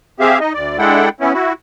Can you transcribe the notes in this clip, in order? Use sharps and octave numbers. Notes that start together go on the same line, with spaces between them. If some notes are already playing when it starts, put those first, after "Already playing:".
C4 G4 G#4 E5 F5
D#4 D#5
D2 D5
G#3 D4 E4 A4 F#5 G5
B3 C#4 E4
E4 F#4